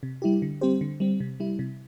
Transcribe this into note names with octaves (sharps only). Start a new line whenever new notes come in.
C3
G3 E4 G4
D3
G3 C4 G4 C5
D3
G3 C4
C3
G3 E4
C3